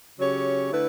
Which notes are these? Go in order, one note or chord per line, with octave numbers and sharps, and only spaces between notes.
C#3 F#3 C#4 G4 C#5
D3 A3 E4 B4